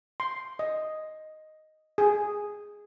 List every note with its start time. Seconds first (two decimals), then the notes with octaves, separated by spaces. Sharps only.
0.20 C6
0.59 D#5
1.98 G#4